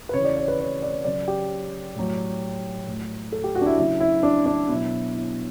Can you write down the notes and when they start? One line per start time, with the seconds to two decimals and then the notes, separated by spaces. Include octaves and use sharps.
0.09 B4
0.14 C#3 E3 C#5
0.25 D5
0.37 C#5
0.48 B4
0.59 C#5
0.82 D5
1.05 C#3 F#3 D5
1.28 G4
1.95 A2 F#3
2.86 A2 F#3
3.32 A4
3.44 G4
3.55 F#4
3.61 D4
3.66 E4
3.78 C#3 F#3 E4
4.00 E4
4.23 D4
4.46 D4
4.68 B2 F#3 E4
5.15 E4